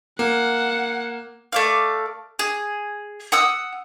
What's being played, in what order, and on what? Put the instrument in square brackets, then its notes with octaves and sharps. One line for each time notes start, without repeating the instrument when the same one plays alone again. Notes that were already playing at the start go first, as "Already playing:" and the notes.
[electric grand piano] A#3 [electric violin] F#5
[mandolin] A3 D5 F5
G#4
F#5 D#6 E6